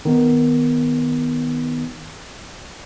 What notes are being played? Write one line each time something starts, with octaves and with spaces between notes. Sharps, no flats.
D#3 B3 D#4